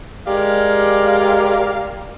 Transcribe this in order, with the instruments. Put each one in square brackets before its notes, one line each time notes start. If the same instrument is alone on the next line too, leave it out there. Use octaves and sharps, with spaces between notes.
[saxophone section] G#3 G4 A#4 D5 F5